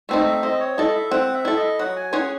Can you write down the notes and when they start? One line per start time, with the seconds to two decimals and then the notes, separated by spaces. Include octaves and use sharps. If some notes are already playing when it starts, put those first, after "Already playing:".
0.09 A3 C4 D#4 E5
0.27 E5
0.43 C4 D#5
0.60 C#5
0.77 E4 A4 D#5
0.95 E5
1.11 C4 F#5
1.34 E5
1.45 E4 A4
1.57 D#5
1.79 F#3 F#5
1.96 G#5
2.13 C#4 G#4 C#5 F#5